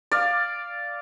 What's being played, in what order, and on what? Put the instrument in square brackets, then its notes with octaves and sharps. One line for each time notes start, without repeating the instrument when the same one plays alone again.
[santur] D5 F5